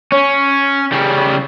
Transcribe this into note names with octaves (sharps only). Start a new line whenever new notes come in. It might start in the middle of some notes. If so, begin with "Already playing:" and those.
C#4
C#3 G3